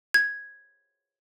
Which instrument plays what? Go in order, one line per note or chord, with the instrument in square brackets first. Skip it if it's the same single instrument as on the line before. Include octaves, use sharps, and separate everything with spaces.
[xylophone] G#6